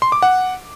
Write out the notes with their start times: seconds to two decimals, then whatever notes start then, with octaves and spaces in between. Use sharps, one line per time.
0.02 C6
0.12 D6
0.22 F#5